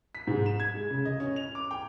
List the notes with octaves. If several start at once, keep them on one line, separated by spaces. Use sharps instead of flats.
B6
G#2
E7
G#6
G#3
C#3
D#5
C#4
F7
D6
G5